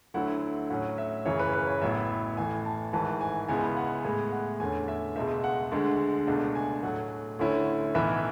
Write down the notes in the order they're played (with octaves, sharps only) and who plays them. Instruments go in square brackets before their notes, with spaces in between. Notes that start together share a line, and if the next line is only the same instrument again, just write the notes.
[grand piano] D2 D3 F#3 A3 E4 F#5
A2 F#3 C#4 F#5
E5
F#2 C#3 E3 C#5
B4
B4
C#5
A1 A2 F#3 B3 E4 E5
A1 A2 E3 A3 G#5
A5
G#1 G#2 E3 A5
G#5
C#2 C#3 G#3 B3 E4 G#5
F#5
A2 G#3 B3 G#5
F#5
E2 D3 A3 C#4 G#5
E5
C#2 B2 G#3 E5
F#5
D2 D3 G#3
C#2 B2 A3 D4 F#5
G#5
A2 F#3 A3 F#5
D2 D3 A3 C#4 E4
B1 A2 E3 B3 E4 E5